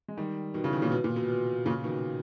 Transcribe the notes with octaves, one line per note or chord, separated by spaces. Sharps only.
G#3
D#3 G3
B2 D#3
C#3 E3
B2 D#3
A#2 C#3
B2
A#2
B2
B2
A#2 C#3
B2 D#3